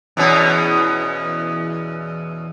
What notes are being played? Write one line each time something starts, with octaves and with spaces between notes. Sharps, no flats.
E2 B2 C#4